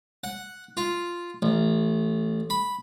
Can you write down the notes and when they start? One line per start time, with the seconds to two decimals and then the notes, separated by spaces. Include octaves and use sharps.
0.24 F#5
0.77 F4
1.42 A1
2.50 B5